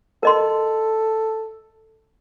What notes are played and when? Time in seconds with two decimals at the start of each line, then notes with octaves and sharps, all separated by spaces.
0.23 A4 A#4 D#5 C6